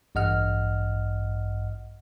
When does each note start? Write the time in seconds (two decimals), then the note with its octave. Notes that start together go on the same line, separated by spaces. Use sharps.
0.15 A1 G2 D#5 F#5 F6